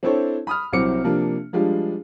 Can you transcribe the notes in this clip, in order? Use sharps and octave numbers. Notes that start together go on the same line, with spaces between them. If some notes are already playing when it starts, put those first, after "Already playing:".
C4 D4 E4 A4 C5 C#5
B5 D#6 F6
C2 F#3 C4 E4 D6 C#7
C3 F3 A#3 D4
F3 G3 G#3 D4 F4